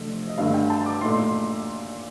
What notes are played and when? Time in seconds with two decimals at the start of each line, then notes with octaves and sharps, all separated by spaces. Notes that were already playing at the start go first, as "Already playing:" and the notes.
Already playing: C3 F3 A3 D4 F4 D#5
0.27 D#5
0.38 G2 D3 A3 F5
0.54 G5
0.70 A5
0.86 D6
1.01 A#2 A3 D#4 C6
1.18 C6